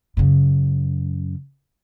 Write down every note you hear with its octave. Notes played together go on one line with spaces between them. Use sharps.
F#2 C#3